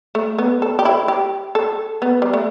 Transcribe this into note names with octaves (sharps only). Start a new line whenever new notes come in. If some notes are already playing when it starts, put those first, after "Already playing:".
A3
B3
A4
G4
E4
G4
A4
B3
G3
A3